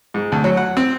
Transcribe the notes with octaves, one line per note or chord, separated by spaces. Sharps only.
G#2
D2
F#3
F#5
C4